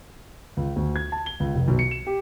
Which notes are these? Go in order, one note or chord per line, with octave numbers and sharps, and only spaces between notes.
C#2
D2
G#6
A5
G7
C#2
F1
B1
C#7
E7
G4